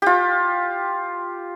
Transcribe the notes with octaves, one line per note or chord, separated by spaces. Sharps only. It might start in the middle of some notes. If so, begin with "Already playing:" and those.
F4 G4